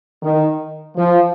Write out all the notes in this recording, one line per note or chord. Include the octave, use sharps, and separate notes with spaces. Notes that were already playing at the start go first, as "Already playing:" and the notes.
D#3
F3